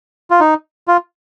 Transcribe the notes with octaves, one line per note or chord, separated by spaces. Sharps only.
F4
D#4
F4